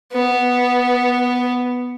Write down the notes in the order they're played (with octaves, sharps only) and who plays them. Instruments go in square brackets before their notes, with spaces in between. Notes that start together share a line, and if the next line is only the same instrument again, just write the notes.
[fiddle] B3